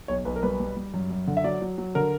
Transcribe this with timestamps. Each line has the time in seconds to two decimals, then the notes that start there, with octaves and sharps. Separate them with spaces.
0.08 B1 C#5
0.25 B1 B4
0.36 A#4
0.43 G3 B4
0.60 G3
0.76 G3
0.94 F#2
1.11 F#2
1.27 D3
1.37 E5
1.44 F#3 D5
1.62 F#3
1.78 F#3
1.95 D3 A#4